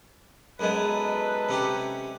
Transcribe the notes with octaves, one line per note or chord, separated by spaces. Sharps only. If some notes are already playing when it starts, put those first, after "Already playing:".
F#2 G#3 B3 D#4 A4 B4
C3 C#4 G4